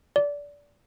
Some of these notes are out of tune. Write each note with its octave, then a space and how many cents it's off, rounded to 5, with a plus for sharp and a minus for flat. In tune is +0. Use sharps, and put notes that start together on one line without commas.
D5 -20